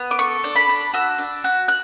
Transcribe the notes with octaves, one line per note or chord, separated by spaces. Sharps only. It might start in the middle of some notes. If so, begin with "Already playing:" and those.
Already playing: B3
D6
A4 C#6
D4
B5
D4
F#4 E6
D4
F#4
F#6